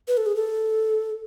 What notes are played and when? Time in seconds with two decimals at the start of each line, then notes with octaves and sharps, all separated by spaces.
0.08 B4
0.17 A4
0.26 G#4
0.36 A4